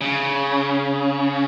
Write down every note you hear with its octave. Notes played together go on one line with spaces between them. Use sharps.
C#3